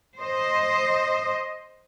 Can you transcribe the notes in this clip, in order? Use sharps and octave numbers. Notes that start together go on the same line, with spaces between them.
C5 D#5